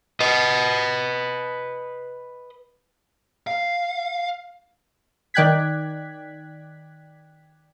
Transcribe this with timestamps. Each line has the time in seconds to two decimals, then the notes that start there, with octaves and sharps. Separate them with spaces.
0.20 B4 D#5
3.47 F5
5.34 D#3 D5 G5 F#6 G#6 B6